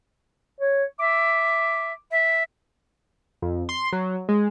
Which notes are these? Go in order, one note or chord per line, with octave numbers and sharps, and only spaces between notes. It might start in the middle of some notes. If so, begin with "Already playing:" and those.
C#5
E5 D6
E5
F2
C6
F#3
G#3